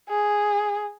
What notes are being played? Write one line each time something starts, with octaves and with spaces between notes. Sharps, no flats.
G#4